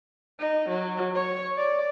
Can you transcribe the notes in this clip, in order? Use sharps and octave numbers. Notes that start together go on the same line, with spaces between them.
D#4
F#3
C#5
D5